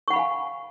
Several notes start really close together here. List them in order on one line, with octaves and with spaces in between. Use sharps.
C#6 F#5 B5 F5 G#5